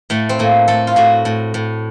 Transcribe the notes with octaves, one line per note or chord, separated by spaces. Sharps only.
A2 A3
C4
A2 A#3
A2 A4
F4
A2 F#4
A2
A2